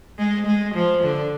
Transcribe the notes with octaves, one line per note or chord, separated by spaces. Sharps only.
G#3
G#3
F3
D3